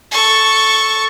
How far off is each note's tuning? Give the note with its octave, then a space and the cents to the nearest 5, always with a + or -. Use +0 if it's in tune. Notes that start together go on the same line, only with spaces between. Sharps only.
A4 +0 C#6 +0